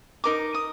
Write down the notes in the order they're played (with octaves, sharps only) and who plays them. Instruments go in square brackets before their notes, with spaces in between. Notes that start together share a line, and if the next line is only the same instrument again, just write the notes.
[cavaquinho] D#4 A#4 D#5 D6
D#6